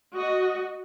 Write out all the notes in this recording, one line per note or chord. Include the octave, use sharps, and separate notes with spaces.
F#4 D#5